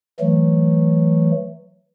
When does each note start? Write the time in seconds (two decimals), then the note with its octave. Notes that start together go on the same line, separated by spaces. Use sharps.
0.20 E3 F#3 A3